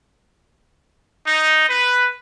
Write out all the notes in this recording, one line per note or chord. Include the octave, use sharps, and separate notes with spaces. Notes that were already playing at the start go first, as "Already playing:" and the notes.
D#4
B4